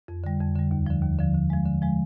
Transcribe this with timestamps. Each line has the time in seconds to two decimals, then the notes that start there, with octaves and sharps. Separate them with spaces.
0.08 F2
0.24 D3 G3
0.40 F2
0.55 D3 G3
0.71 D#2
0.86 D3 F3
1.03 D#2
1.19 D3 F3
1.34 D3
1.50 F3 G#3
1.66 D3
1.82 F3 G#3